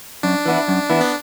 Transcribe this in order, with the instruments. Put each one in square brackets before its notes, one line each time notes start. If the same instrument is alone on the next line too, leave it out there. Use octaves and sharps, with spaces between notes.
[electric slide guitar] F#2 [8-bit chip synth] D4
[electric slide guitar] E3 B3 E4
F#2
E3 B3 E4
[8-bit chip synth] B3